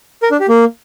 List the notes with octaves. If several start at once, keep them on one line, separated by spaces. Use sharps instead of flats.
A#4
D4
G4
A#3